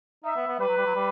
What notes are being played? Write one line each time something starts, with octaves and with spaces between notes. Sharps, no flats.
D#4 E5
B3
B3
G3 B4
F#3
G3
F#3
G3